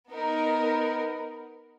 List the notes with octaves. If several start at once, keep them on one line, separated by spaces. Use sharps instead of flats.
B3 D#4 A#4